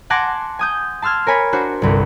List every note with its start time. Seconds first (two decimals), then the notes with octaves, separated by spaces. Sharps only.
0.10 F#5 G#5 A5 C6 D6 A#6
0.59 G#5 D#6 G6
1.02 A5 C6 E6 F6 G#6
1.27 A#4 C#5 G#5 B5
1.53 D4 F#4 C5
1.82 G1 C2